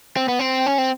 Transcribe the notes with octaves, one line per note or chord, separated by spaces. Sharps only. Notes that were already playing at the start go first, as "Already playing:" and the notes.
C4
B3
C4
C#4
C4